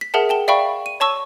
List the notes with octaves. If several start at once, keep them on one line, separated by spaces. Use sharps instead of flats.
B6
G#4 A#4 E5 F#5 A5
G5 A5 G7
D5 E5 F5 G5 B5 C#6
D#7
C#5 A5 C#6 E6